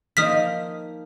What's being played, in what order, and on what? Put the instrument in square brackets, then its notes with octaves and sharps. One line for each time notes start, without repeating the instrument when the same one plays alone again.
[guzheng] F3 A#3 D#4 [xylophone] D#6 F6 B6